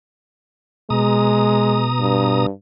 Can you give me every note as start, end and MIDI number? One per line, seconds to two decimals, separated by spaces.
0.90 2.46 47
0.90 1.89 56
0.90 2.46 82
0.90 2.46 87
2.00 2.50 43